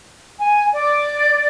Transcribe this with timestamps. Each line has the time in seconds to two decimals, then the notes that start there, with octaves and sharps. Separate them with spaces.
0.39 G#5
0.72 D5